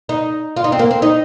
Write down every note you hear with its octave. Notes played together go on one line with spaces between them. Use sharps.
D#4
F4
D#4
C4
A#3
C4
D#4